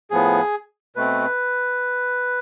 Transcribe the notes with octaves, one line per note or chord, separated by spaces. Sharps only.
A2 F3 B3 G#4
B2 A3 C4 B4